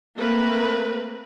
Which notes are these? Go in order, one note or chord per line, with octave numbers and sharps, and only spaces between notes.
A3 A#3 C4 A#4 B4